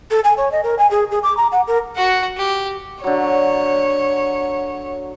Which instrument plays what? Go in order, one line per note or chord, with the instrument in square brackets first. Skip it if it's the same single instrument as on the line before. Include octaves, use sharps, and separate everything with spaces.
[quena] A4
G#5
C#5
D#5
A#4
G#5
G#4
G#4
D6
A#5
F#5
A#4
[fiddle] F#4 F#5
G4
[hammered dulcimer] D3 F#3 [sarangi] C#5